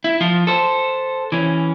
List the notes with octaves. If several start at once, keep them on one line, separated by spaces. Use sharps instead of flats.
E4
F3 F4
A4 C5
E3 C#4